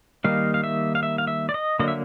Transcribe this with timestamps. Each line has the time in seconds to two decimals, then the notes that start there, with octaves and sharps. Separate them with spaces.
0.24 D#3 G3 A#3 D#4 F5
0.54 F5
0.64 E5
0.95 F5
1.03 E5
1.18 F5
1.27 E5
1.49 D5
1.54 D#5
1.79 D3 F#3 A#3 D#5
1.88 E5